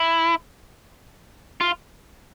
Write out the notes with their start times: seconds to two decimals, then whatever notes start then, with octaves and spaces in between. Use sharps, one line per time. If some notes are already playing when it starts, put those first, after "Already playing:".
Already playing: E4
1.61 F4